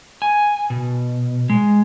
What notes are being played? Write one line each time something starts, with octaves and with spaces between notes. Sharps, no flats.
G#5
B2
G#3